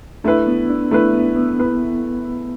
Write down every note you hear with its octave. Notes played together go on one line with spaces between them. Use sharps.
A3 D4 E4 B4
B3
D4
A3 D4 E4 B4
B3
B3
B3 E4 B4